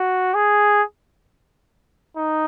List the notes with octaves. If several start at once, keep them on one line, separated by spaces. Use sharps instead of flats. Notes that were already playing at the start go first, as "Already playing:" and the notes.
Already playing: F#4
G#4
D#4